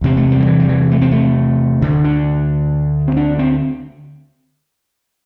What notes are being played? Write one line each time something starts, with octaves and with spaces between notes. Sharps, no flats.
E2 C3 C4
A3
G3
D3
E3
G3
E3
A3
C4
A3
D2 D3
D4
C4
D4
C4